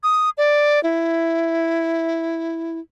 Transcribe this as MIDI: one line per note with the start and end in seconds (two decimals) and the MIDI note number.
0.03 0.30 87
0.38 0.82 74
0.83 2.79 64